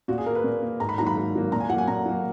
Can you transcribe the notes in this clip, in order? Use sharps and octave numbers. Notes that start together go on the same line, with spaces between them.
A#2 F#4
G#4
A#3 A#4
B4
A#2
A#3
G#2 A#5
B5
D#3 F#3 A#3 A#5
B5
G#2
D#3 F#3 A#3
A#2 A#5
G#5
F#3 A#3 F#5
G#5
A#2 A#5
F#3 A#3